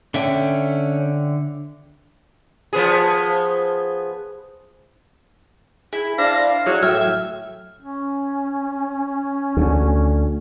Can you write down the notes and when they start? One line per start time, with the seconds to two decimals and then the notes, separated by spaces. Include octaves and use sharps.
0.14 D3 C#4 E5 G5
2.73 F3 B3 G#4
5.93 E4 G#4
6.18 D4 C5 D5 F5 A#6
6.66 F#3 E4 G#4 A4 D5
6.83 A2 F#3 E5 G5 F6 G#6
7.81 C#4
9.57 D2